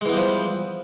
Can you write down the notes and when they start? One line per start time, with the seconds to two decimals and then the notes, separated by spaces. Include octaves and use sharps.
0.01 G#3
0.05 E3
0.09 B3
0.13 G3
0.17 F3